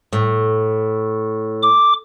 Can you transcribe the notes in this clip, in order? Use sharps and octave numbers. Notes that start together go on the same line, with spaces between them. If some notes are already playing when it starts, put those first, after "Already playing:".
A2
D6